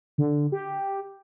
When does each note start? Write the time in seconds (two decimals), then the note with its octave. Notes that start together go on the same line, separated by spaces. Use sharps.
0.18 D3
0.52 G4